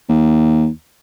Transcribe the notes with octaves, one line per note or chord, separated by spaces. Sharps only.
D#2